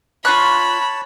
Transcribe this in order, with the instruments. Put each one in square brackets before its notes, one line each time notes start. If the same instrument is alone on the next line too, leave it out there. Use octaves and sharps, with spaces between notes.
[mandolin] F4 C#6 F#6 [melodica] C#5 A5 [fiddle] B5